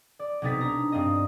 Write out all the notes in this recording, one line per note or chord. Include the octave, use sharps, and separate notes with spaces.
D5
B1 C3 D#4 A6 B6
D4 D#4 A#5
G2 C4 F4 D#5